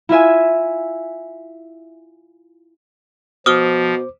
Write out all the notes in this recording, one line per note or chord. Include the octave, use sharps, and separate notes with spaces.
E4 F4 E5 G#5
B2 F3 C5 D6 D#6 F6 G7